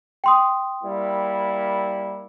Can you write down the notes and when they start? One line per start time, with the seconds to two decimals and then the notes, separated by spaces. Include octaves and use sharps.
0.24 G5 C6 D#6
0.84 G3 A#3 E4